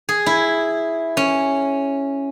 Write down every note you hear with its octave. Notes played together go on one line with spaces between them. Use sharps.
G#4
E4
C#4